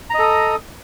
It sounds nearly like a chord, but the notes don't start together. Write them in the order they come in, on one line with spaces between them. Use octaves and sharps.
A#5 D#5 A4 D#6